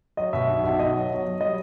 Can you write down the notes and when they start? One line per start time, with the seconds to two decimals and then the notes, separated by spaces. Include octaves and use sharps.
0.17 F#3 D#5
0.33 B2 E5
0.49 B1
0.64 B1
0.79 B2 D#5
0.94 F#3
1.10 F#3
1.25 F#3
1.41 G3 D#5